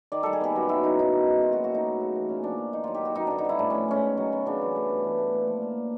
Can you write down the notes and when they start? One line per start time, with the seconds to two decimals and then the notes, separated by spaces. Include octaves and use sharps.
0.12 D#3 D5
0.23 G3 A4
0.33 G#4
0.41 B3 G4
0.56 F#2 F#4
0.69 D#3 E4
0.84 F#3 D#4
0.98 F#2 D#4
1.13 D#3
1.27 G#3
1.42 A#2 F4
1.52 F#3 F#4
1.64 F#4
1.72 A3 D#4
1.86 F#2
2.01 C#3
2.15 E3
2.29 A#2 C#4
2.43 F3 D4
2.58 A#3
2.73 D#3 D#4
2.84 F#3 F4
2.94 G4
3.01 B3 F#4
3.15 F#2 D#4
3.27 D3 D4
3.38 D#4
3.45 G3 E4
3.59 A2 D4
3.70 F3 C#4
3.88 G#3 C#4
4.04 D#3
4.17 F#3
4.32 B3
4.46 C#3 D4
4.62 E3
4.76 A3
4.89 G2
5.04 E3
5.18 A3
5.34 A#2
5.47 F3
5.62 A#3